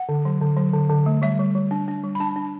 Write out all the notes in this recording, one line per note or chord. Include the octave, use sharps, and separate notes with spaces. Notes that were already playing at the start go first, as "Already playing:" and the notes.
Already playing: F#5
D3
F#3
D3
F#3
D3
D3
A3
G3 E5
G3
G3
D4
D4
G3
B5
D4 A5
D4